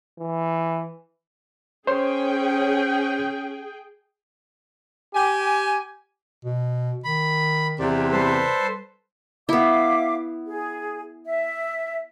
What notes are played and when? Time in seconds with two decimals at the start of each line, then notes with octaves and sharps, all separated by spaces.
0.19 E3
1.87 C#4 G#4 C5 C#5 G5 C6
5.14 G4 G#5
6.45 B2
7.04 D#3 B5
7.79 E2 C3 D5
8.12 G3 A4 B4 C5
9.49 B3 E4 E5 F5 D6
10.47 G#4
11.26 E5